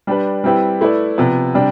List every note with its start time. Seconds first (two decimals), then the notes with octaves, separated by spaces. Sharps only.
0.07 G3 D4 G4 B4
0.44 G3 C4 E4 G4 B4
0.81 A3 E4 B4 D5
1.18 C3 F3 B3
1.54 C3 G3 D4